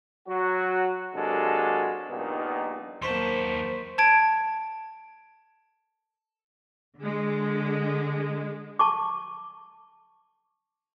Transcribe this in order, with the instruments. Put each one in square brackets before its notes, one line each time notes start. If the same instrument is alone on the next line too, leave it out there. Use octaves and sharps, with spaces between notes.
[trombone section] F#3 F#4
C3 F#3 G#3 A#3 D4 A4
A#1 G2 A#2 D#3 B3 D#4
[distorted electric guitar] D#2 A5 [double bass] F#3 A#3 [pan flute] C5 [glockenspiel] C6 C#6 B6
[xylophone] A5 G#6 D7
[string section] D3 G#3
[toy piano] A5 C#6 D6